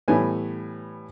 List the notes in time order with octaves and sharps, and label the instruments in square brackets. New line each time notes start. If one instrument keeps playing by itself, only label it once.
[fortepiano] A2 E3 G3 B3 G#5